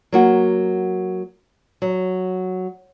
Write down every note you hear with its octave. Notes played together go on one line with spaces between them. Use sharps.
F#3 A#3 F#4
F#3